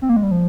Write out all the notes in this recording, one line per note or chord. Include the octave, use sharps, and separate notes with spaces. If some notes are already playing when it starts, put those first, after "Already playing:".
C4
A#3
G#3
G3
F3